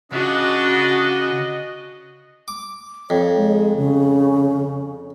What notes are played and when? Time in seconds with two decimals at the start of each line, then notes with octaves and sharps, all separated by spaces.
0.12 C#3 D4 F#4 D#5
2.48 D6
3.10 F2 C#5
3.36 G#3
3.77 C#3